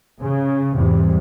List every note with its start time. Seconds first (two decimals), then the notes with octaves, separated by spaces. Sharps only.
0.21 C#3
0.74 E2 G#2 C3 G3